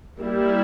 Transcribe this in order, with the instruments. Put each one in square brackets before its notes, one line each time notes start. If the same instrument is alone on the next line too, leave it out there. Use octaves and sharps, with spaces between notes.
[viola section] G3 A#3 E4